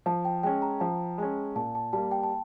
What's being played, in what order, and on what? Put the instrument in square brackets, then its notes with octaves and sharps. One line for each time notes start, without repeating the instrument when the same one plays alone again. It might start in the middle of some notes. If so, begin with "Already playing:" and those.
[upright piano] F3 [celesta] A5
[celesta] G5
[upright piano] G#3 C#4 [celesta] G5
[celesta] A#5
[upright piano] F3 [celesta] A5
[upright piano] G#3 C#4
[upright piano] A#2 [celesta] A5
[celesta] A5
[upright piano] G3 A#3 [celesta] A5
[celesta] G5
A5